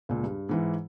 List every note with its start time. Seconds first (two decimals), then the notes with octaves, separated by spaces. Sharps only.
0.09 C#2 A#2
0.24 G2
0.49 G#2 E3 E4